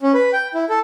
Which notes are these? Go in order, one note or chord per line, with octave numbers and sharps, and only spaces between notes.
C#4
B4
G5
E4
A4